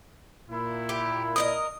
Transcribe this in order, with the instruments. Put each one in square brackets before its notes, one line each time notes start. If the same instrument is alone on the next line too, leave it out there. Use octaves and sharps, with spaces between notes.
[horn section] A#2 E4
[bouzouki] G4
[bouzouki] A#4 D5 D#5 [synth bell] D#6